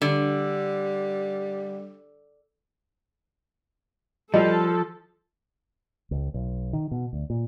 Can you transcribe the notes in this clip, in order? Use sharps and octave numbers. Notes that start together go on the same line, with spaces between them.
D3 G3
F3 G3 A4 D#5
C#2
B1
D#3
B2
D2
A#2